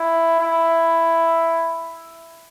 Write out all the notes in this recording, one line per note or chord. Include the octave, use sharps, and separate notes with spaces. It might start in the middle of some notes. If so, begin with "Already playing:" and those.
Already playing: E4
E4